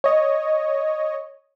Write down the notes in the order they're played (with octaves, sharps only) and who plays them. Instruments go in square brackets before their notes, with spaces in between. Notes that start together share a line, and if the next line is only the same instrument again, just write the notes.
[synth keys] C#5 D#5